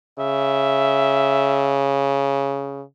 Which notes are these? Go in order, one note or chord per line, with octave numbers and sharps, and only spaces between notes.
C#3 E5